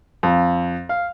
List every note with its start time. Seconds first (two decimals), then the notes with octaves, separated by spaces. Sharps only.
0.23 F2
0.89 F5